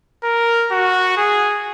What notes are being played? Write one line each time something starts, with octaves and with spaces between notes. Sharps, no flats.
A#4
F#4
G#4